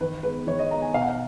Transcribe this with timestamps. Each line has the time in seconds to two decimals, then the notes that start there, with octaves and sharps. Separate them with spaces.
0.01 D#3 B4
0.23 G#3 B3 B4
0.47 D#3 C#5
0.59 D#5
0.71 G#3 B3 A#5
0.82 G#5
0.94 B2 F5
1.02 F#5
1.09 F5